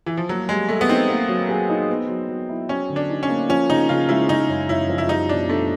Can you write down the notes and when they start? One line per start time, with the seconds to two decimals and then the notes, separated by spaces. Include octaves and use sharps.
0.06 E3
0.17 F3
0.29 F#3 A#3
0.49 G3 G#3
0.69 G3 A3
0.81 B3
0.89 C4 D#4
1.09 A#3
1.29 F#3
1.49 G#4
1.69 D#4
1.90 B3
2.09 F#3
2.29 F#3
2.49 E4
2.69 F#3 C#4
2.90 D3
2.96 D4
3.10 D#4
3.23 C#4
3.29 A#3
3.49 F3 C#4
3.69 C#3 D#4
3.89 C#3 F4
4.09 G#3 E4
4.29 C#3 D#4
4.49 F#2
4.69 F#2 E4
4.89 F3
4.98 E4
5.09 G3 D#4
5.29 B2 D4
5.49 A3 D4